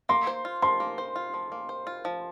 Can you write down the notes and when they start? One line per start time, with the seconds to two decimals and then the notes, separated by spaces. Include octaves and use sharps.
0.09 A#3 C6
0.27 C5
0.45 F4
0.62 F3 C6
0.80 A#3
0.98 C5
1.16 F4
1.34 F3
1.52 A#3
1.69 C5
1.87 F4
2.05 F3